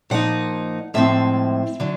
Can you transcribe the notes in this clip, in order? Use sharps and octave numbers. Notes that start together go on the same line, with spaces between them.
A#2 F3 A#3 D#4 F#5
A2 F3 G#3 C4 E5
D3 F#3